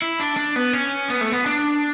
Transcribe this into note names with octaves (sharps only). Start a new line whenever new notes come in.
E4
D4
D4
B3
C#4
B3
A3
B3
D4